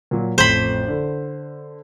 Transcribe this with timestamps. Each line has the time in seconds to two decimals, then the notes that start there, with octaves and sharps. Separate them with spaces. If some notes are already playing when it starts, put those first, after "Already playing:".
0.11 A#2 F#3
0.38 A1 F2 C5 B5
0.88 D3